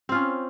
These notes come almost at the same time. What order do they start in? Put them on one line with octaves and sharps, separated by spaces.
C4 F4 C#4